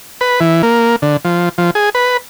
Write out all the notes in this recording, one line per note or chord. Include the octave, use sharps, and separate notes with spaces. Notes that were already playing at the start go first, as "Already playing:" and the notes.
B4
E3
A#3
D3
F3
F3
G#4
B4